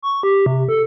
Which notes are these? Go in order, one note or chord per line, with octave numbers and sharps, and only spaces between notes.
C#6
G4
C3
A4